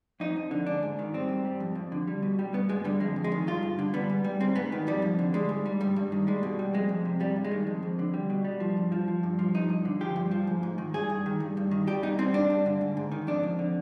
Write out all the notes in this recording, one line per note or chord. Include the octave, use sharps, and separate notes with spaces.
F2 D#4
F2
D3
G#2 D4
G#2
D#3
G3 C4
G#2
G3
F2
F2
D3
G3
B2
G3
G2 B3
G2 G#3
D3 G3
F2 G#3
F2
G#3
D#3
G2 F4
G2
D3
G3 B3
G#2
G3
G#2 C4
G#2 B3
D#3
F2 G3
F2
D3
G3 G#3
G#2
G3
G2 G3
G2
D#3
G3 G#3
B2
G3
F2 G#3
F2
C3
G2 G3
G2
G#3
D#3
F2
F2
D3
G3
B2
G3
F3
G2
F3
F3
G2
F3
G2 D#4
G2
D3
F3 G4
G2
F3
G#2
G#2
D#3
G2 G#4
G2
D#3
G2
G2
D#3
G3 G4
B2 D#4
G3 C4
G2 D4
G2
D3
G#2
G#2
D#3
F2 D4
F2
D3